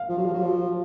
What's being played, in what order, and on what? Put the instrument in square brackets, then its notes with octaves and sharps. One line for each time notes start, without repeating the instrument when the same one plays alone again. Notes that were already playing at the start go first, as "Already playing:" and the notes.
Already playing: [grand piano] F5
[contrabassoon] F3
F#3
F3
F#3
F3